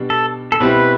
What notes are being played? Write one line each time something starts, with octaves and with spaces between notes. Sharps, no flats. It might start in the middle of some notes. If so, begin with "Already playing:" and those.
Already playing: B2 G3 D4
A4
A4
B2 G3 C4 E4 B4